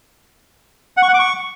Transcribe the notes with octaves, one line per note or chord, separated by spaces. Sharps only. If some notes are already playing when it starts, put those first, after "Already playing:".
F#5
C#6
F#5
D6
C#6